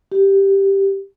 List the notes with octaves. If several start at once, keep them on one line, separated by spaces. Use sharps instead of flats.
G4